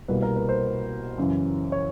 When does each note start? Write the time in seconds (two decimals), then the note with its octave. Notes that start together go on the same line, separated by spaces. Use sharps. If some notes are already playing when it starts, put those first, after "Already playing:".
0.08 C2 B2 G3 A#3 B4
0.22 A#4
0.36 B4
0.49 C5
1.18 F#2 C#3 E3
1.72 C#5